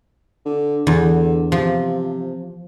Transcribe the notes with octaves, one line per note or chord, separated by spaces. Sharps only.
D3
E2 D3
C3 F3